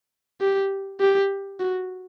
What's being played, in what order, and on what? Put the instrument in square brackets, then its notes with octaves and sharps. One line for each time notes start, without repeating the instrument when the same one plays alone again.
[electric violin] G4
G4
F#4